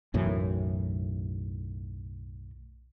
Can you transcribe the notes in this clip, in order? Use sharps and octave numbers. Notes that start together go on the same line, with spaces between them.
B1 F#2 A2 E3